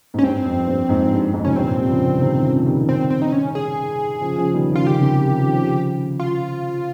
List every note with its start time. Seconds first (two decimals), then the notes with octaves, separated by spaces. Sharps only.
0.14 G#2
0.19 C#4
0.23 G2 C4
0.45 F2
0.68 G2
0.89 F2 G#2
1.12 G2
1.33 F2 G#2
1.45 C3 C#4
1.56 G2 A#2 C4
1.78 G3
1.89 C#3 F3
2.22 C3 D#3
2.44 C#3 F3
2.66 D#3 G3
2.89 C4
3.10 C4
3.22 D#4
3.32 C#4
3.55 G#4
4.21 C#3 F3
4.37 C#3 F3
4.54 D#3 G3
4.71 C#3 F3 F4
4.87 D#3 G4
4.94 C#3
5.01 C3 D#3
5.20 F3
5.27 D#3
5.34 C#3 F3
5.47 D#3
5.53 C#3 F3
6.20 F4